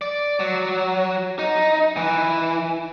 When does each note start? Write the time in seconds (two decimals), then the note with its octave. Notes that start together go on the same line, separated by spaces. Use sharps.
0.01 D5
0.40 F#3
1.39 D#4
1.97 E3